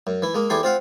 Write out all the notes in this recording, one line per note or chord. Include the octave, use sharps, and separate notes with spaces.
F#2
E3 E4
G#3 A#3
E2 E4 G4 A4 G#5 C6
C4 F4 F5 F#5